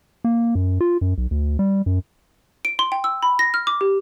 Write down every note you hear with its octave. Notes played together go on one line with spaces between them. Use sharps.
A#3
F#2
F4
F#2
B1
D2
G3
F#2
D7
C6
G5
E6
B5
A#6
F6
D6
G4